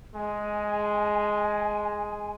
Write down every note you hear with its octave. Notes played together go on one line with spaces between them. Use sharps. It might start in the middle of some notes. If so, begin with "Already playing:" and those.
G#3 G#5